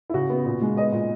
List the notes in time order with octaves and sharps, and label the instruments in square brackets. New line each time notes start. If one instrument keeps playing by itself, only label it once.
[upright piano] E4
C#3 F#4
B3
A#2
G#3
B3 D#5
A#2